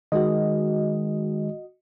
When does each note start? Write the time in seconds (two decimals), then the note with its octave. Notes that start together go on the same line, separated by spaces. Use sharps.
0.12 D#3 G#3 F#4 D#5